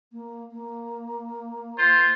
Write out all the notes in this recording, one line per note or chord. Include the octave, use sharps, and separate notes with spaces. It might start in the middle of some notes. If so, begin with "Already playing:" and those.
A#3
A#3
F4 C5